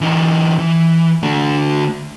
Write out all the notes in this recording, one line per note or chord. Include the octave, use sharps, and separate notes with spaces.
E3 D#4
E3
D3 A3